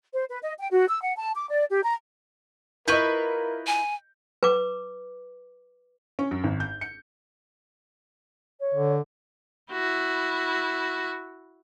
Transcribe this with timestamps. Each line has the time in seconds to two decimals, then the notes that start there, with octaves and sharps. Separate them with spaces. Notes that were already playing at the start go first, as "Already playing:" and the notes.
0.13 C5
0.28 B4
0.42 D#5
0.59 G5
0.71 F#4
0.88 E6
1.02 F#5
1.16 A5
1.35 D6
1.49 D5
1.70 G4
1.83 A#5
2.88 E4 F4 A#4 B4 D#5 C#6 G6
3.67 G#5
4.43 B4 D6
6.19 C#4
6.31 F#2
6.44 G#1
6.60 G6
6.81 C#7
8.60 C#5
8.74 D3
9.72 E4 F#4